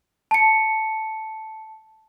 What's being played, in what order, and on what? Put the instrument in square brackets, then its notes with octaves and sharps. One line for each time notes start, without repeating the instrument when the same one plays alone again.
[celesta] A5 C#7